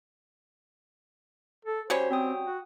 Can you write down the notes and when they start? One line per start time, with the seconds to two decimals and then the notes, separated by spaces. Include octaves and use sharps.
1.65 A4
1.90 G3 C#4 F#4 C5 C#5
2.11 C4 F#4 G5 D#6
2.46 F#4